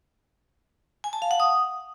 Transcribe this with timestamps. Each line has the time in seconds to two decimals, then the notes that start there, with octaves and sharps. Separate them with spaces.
1.04 G#5
1.13 A5
1.22 F5
1.31 F#5
1.40 D#6